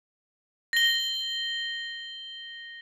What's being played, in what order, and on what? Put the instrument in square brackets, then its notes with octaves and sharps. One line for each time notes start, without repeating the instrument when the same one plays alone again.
[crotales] A#6 G7